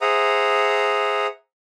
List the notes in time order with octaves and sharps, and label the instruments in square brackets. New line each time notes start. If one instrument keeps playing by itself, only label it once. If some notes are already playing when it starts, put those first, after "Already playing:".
[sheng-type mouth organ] G#4 C5 E5 F#5 A#5 D#6